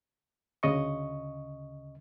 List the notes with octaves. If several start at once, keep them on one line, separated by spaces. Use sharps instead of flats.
D2 C#3 D#5 C#6